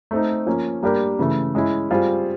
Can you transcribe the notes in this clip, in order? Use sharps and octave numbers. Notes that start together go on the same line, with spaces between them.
A3 C4 D#4
F3 A#3 C#4
G3 A#3 D4 G4 A#4
C#3 E3 A3
G#3 C#4 E4
G3 C4 F4 G#4